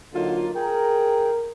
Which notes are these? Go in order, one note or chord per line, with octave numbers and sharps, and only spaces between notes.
D3 F#3 A#3 D#4 F4
G#4 A#4 G5